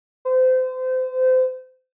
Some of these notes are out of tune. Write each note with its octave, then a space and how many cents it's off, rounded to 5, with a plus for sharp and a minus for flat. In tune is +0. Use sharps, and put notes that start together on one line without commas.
C5 -30